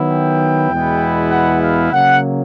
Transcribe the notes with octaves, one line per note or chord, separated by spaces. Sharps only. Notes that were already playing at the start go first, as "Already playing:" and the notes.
Already playing: D#3 F#3 B3 E4
G5
E2 B2 G#3 B3 E4
F#5
F5
C#3 F#3 A#3 F#5